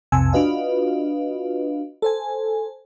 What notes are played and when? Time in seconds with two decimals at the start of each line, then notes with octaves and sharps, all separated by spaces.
0.12 B1 F2 C3 G#5 A5 E6
0.33 D4 F4 F#4 B4 D#5 F5
2.02 A4 C5 G#5